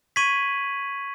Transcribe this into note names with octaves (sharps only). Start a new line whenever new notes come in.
C#6 G#6 B6 D#7 F#7